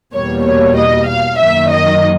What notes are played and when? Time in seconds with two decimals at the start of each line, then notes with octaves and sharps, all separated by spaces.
0.13 E2 B2 G3 A#3 C#5
0.44 C#5
0.76 D#5
1.07 F5
1.38 F#2 D#3 F#3 A#3 E5
1.70 D#5